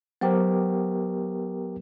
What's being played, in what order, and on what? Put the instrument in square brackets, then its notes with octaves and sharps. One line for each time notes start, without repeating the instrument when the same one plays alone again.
[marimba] F#3 C5 G5 [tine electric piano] B3 G4 A#4